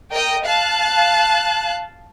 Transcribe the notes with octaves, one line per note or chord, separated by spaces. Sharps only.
A#4 D#5 G5
F5 A5 F#6